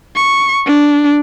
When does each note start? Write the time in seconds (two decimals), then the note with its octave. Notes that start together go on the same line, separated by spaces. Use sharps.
0.15 C#6
0.66 D4